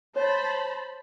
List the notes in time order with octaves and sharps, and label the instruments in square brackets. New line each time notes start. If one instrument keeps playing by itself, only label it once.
[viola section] C5 A5 B5 [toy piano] C#5